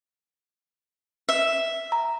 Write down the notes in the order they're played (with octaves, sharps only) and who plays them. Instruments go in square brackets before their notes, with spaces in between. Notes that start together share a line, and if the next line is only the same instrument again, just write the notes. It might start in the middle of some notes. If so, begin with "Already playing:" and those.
[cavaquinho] E5
[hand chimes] A#5